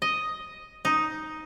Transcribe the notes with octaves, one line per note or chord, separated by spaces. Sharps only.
D#5
D#4